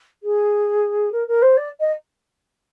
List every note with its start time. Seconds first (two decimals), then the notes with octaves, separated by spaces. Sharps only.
0.23 G#4
1.12 A#4
1.28 A#4
1.42 C5
1.57 D5
1.80 D#5